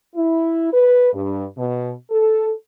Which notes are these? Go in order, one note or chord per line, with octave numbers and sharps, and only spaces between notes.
E4
B4
G2
B2
A4